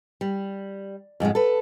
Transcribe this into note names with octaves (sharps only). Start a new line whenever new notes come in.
G3
F2 G#2 C#3 G#3
A4 B4